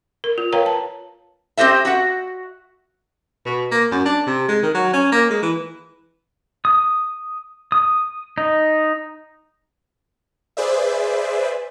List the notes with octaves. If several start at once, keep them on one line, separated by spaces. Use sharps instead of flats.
A#4
F4
A#4 B4 C#5 F5 G5 A#5
A5
C4 G4 C5 D#5 E5
F#4 E5 F#5
B2
A#3
F#2
D4
C3
G#3
D#3
F#3
C#4
A#3
G#3
E3
D#6
D#6
D#4
G#4 B4 C5 D5 E5